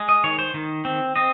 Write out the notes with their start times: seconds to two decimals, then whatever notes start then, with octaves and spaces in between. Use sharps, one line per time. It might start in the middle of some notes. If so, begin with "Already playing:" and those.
Already playing: G#3
0.09 D#5
0.24 D#3 C#5
0.39 C5
0.54 D#3
0.85 C4
1.16 C4 D#5